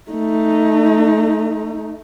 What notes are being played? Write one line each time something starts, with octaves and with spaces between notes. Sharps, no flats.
A3 D#4